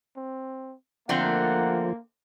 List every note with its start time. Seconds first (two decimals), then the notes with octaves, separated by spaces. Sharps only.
0.16 C4
1.09 D3 F3 A3 A#3 C4 F#5